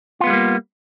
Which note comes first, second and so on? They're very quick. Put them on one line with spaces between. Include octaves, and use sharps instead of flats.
F4 B3 G#3 G3 A#3